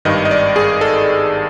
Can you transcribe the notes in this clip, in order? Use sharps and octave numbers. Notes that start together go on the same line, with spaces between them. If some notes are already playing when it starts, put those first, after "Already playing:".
G#1 G2 D#3 D#5
D#5
D5
G#4
A4